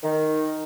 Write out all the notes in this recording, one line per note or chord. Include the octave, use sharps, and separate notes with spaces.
D#3